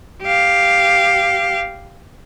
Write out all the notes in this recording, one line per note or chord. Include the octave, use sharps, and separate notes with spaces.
G4 F5